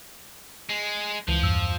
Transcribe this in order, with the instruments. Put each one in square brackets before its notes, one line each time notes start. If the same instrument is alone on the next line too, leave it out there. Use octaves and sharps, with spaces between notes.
[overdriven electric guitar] G#3
[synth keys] C#2 E3 [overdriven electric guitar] F3
[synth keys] E2 G2 E6